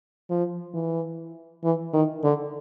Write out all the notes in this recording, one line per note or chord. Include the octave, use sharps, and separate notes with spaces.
F3
E3
E3
D#3
D3